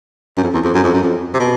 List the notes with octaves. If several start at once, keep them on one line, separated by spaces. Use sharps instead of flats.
F#2
F2
E2
F2
F#2
F2
F#2
F2
C3
B2